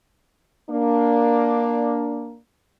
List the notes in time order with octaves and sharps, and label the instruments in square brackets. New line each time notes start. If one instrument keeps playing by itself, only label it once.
[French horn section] A#3 D4